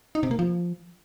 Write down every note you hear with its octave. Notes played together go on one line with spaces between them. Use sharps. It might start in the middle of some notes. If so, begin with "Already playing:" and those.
D#4
C3
A#3
F3